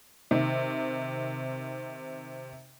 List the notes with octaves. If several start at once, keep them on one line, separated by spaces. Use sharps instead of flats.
C3 D#3